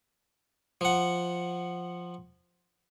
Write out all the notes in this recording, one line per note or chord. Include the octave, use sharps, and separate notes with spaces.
F3 F#5